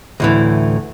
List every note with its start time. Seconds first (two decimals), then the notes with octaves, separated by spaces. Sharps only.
0.20 D2 A2 E3